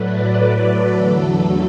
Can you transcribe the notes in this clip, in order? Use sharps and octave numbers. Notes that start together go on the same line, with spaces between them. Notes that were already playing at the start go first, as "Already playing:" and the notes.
Already playing: A2 F#3 A3 B4 D5
B4
A4
E2 D3 F#3 A3